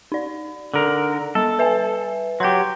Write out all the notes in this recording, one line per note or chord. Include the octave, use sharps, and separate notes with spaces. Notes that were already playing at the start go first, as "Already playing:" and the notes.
D#4 D5
D3 A#4
G3 A4
B4 E5 G#5
F#3 G4 C6 G6